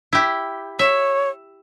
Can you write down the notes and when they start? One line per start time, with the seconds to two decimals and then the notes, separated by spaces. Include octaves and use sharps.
0.13 E4 G4
0.79 C#5 E5